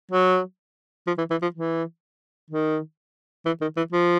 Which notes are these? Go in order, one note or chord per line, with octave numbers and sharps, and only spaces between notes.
F#3
F3
E3
E3
F3
E3
D#3
E3
D#3
E3
F3